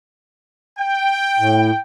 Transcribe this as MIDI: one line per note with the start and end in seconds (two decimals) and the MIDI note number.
0.79 1.80 79
1.39 1.71 45